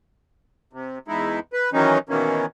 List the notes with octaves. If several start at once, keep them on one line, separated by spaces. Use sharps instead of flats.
C3
E2 G#3 D#4 E4
B4
D#3 E3 F#3 C#4 D#4
B2 D#3 E3 A#3 C#4